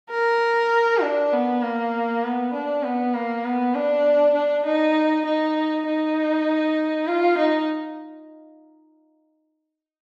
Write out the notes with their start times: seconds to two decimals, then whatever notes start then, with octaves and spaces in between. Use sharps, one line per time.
0.11 A#4
1.02 D4
1.33 B3
1.63 A#3
2.23 B3
2.53 D4
2.83 B3
3.14 A#3
3.45 B3
3.75 D4
4.35 D4
4.66 D#4
5.26 D#4
5.86 D#4
7.07 F4
7.38 D#4